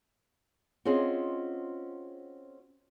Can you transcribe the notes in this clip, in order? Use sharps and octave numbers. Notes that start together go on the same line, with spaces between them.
C4 C#4 F4 F#4 G#4 D#5